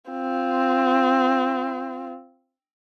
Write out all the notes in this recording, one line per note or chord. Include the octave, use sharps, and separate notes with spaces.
C4 F4